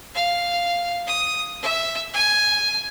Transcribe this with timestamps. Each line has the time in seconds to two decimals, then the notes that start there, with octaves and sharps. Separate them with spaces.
0.15 F5
1.07 D#6
1.62 E5
2.14 G#5